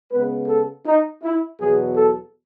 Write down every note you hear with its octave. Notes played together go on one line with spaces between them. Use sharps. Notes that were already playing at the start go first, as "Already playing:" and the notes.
C#3 G#3 B3 B4
A4
D#4
E4
E2 B2 F#3 B3 G#4
A4